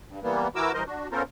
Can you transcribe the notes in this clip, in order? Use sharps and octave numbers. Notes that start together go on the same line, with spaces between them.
G2
E3 G3 A#3 B3
E3 E4 F#4 A#4 D6 E6
G2 E3 A#4 C5 D#5
D4 F#4
B3 C#4 F4 A4 A#4 C5